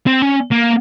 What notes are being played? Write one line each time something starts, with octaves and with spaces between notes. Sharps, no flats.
C4
C#4
A#3